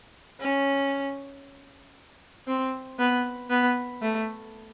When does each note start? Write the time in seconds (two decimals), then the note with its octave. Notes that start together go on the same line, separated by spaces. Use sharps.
0.41 C#4
2.47 C4
2.98 B3
3.50 B3
4.02 A3